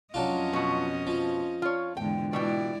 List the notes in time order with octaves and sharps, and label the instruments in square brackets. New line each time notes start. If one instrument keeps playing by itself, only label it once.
[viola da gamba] F2 C#4 D#5 [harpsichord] F#3 D4 F4
[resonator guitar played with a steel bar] B2 F#4
[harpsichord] F3
[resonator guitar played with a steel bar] F4 C#5
[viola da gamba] E2 G#2 D3 [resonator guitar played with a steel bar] G5
[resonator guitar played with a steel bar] B2 E3 G5 [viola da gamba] G#3 E4 D5